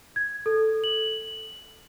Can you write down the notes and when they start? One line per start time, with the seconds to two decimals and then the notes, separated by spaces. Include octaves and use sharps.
0.16 G#6
0.46 A4
0.84 F#7